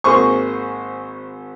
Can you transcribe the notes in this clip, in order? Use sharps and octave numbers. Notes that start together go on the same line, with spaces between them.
G#1 A#3 G#4 C5 C#6